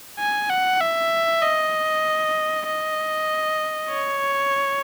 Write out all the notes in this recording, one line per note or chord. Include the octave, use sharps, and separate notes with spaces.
G#5
F#5
E5
D#5
D#5
C#5